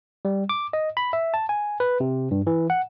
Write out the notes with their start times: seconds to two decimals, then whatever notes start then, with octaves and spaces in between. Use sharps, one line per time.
0.25 G3
0.49 D6
0.73 D#5
0.97 B5
1.13 E5
1.34 A5
1.49 G#5
1.80 B4
2.00 C3
2.31 G2
2.47 E3
2.70 F#5